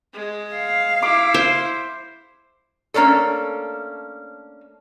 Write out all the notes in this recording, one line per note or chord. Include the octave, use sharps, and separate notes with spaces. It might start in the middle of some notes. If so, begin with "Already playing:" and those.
G#3
F5
E4 D6
C5
A3 A#3 C#4 D4 A4